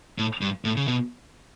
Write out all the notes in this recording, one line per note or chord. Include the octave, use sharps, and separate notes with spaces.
A2
G2
A2
C#3
B2